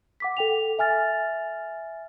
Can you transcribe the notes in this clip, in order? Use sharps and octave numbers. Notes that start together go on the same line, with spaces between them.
F#5 D6 B6
A4 G5 F7
E5 G#5 F6 A6